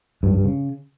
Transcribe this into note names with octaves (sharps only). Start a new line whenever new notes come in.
G2
G2
C#3